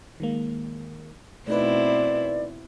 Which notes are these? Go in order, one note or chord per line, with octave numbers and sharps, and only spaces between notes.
D#3 G#3 A#3
B2 A3 C4 D#4 E4 B4 D5